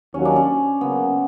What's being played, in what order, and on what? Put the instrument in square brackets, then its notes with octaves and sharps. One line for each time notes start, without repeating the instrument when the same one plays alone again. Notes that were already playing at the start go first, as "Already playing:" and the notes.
[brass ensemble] D#2 D#3 F#3 A#3 [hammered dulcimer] C#4
[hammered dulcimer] D4
C#4
[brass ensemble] C#3 F#3 A#3 [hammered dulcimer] B3